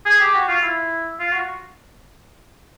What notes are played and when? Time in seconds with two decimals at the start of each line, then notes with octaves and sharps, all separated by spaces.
0.06 G#4
0.20 G4
0.34 F#4
0.48 F4
0.62 E4
1.20 F4
1.33 F#4